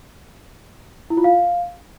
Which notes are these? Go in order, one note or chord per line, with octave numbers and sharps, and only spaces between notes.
E4
F4
F5